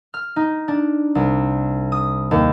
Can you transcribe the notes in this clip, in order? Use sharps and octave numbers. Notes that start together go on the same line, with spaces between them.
F6
D#4
D4
C2
D#6
D#2